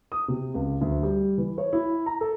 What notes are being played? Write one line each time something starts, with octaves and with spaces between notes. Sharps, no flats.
D#6
C3
C#2
D2
G3
E3
C#5
E4
A#5
A4